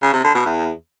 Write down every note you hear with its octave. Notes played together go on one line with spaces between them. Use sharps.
C#3
C3
D3
B2
E2